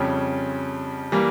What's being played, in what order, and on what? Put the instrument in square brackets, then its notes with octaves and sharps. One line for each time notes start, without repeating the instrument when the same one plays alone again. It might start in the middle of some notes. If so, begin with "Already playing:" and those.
Already playing: [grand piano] F2 C#3 G3 C#4 G4
E3 G3 A#3